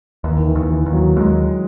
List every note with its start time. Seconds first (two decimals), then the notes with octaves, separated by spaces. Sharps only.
0.24 D#2 E3
0.37 D#3
0.47 E3
0.55 D#2
0.70 E3
0.86 D#2
0.93 F#3
1.16 D#2 G#3